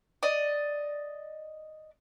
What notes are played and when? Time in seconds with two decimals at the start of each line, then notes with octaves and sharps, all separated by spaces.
0.23 D5 D#5